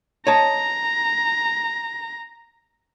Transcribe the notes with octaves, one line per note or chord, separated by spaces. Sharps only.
C#5 D#5 A5 A#5